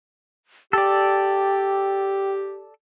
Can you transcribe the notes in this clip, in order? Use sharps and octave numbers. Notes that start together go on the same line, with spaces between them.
G4 A4 D5 G5